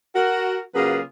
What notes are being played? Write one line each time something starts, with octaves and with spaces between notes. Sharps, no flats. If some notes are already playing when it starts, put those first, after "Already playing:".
F#4 A#4
C#3 F#3 A#3 F4 G#4 B4